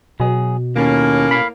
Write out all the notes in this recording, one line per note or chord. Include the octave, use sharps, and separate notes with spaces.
B2 F#3 G#4
D#2 A2 A#3 C#4
F5 B5